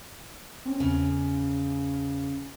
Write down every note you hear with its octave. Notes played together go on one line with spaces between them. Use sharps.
C4 C#4
E2 C#3